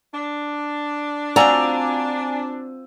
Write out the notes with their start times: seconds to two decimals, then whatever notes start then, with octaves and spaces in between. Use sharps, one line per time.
0.12 D4
1.36 C4 F4 F#4 D5 G#5 A#5 E6